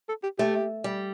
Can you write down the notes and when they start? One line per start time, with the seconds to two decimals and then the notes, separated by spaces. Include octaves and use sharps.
0.09 A4
0.23 G4
0.38 A3 G4
0.84 G3